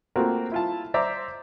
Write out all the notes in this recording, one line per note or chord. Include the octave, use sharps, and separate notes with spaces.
A3 A#3 C4 F4 F#4 A#4
E4 F4 A5
C5 D5 E5 A#5 D6